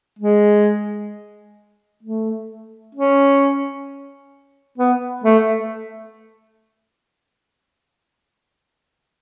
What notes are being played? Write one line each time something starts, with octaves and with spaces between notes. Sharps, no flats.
G#3
A3
C#4
B3
A3